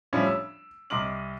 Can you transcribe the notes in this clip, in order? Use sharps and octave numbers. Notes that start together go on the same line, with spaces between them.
A2 F3 G3 C#4 D4 E5
E6
C2 D#5 C6 D6 F6 F#7